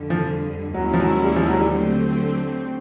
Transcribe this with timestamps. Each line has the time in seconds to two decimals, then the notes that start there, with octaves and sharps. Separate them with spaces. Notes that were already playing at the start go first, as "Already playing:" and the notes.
Already playing: F2 D3 G3
0.10 F3
0.74 D#2 D#3 F#3 G#3 C#4 E4
0.94 F3
0.99 F#3
1.24 G3
1.36 F3
1.48 F#3
1.60 G3
1.73 D3 F#3 A3 C4